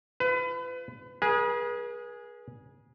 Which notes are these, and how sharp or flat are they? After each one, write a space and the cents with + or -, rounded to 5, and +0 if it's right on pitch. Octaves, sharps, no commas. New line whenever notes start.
F4 -25 B4 +30
G#4 +0 B4 -45